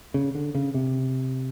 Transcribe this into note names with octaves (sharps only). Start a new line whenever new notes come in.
C#3
D3
C#3
C3